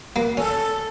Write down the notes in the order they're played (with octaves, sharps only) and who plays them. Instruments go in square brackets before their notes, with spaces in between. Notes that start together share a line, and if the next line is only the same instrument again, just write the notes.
[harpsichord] A#3 [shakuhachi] B4
[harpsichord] C#4 [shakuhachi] A4